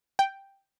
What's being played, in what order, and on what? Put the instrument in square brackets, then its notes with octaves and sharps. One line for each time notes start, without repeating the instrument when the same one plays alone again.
[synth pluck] G5